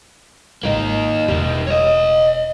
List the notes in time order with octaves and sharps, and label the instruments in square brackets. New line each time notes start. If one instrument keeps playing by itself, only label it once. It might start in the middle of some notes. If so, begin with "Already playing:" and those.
[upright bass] G#1 F4 [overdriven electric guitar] A#3 D#4
[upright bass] E1 [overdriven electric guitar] D#3 G3
[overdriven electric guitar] C#5 D#5